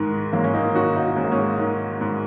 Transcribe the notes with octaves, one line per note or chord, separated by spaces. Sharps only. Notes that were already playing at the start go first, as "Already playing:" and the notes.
Already playing: G#2 D#3 G#3
G#2 F#3 A#3
C#4
A#3 D#4
D#3 C#4 F#4
A#3 D#4
G#2 C#4
A#3
G#3 C#4
D#3
G#2